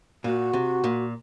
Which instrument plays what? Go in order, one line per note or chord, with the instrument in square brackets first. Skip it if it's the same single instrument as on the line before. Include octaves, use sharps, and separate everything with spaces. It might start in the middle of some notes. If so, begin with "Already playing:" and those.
[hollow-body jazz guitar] A#2 [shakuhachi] F#4
[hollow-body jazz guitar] C3
A#2